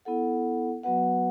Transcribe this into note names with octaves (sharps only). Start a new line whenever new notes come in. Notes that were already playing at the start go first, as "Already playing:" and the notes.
B3 E4 A4 F#5
F#3 B3 F#4 B4 F#5